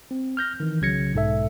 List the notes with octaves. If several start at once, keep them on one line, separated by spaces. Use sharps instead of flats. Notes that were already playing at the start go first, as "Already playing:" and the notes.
C4
F6 G6 A#6
D#3 E3
C2 C#3 F#3 G#6 A#6 C#7
B1 G#2 B2 A4 E5